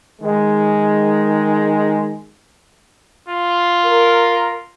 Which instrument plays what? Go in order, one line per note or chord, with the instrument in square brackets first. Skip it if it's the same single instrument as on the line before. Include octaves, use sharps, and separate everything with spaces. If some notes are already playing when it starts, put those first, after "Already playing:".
[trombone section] D#3 G#3
[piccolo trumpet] F4
[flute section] A#4